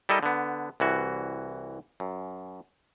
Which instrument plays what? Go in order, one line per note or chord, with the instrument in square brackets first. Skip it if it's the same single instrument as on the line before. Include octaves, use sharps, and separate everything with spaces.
[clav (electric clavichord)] G3 E4 A4 A#4 D#5
D3 B3
C2 E3 F#4
F#2